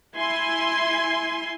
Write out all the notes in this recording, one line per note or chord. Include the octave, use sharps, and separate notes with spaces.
E4 G#5 C6